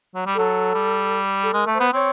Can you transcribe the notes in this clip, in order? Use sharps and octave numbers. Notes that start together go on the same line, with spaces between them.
F#3
G3
F#3 A4
G3
A4
G#3 A#4
A3
C5
B3
C4 C#5